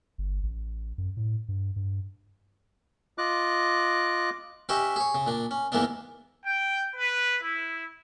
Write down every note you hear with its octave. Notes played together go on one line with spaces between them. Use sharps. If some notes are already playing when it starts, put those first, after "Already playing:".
G1
A1
F#2
A2
G2
G2
F4 D#5 D6 F#6
C#4 G4 B4 C#5 D#5 E5
G#4 C#5
C#3
A#2 D4
C#4
E2 G#2 E3 A#3 B3 D4
G5
B4
E4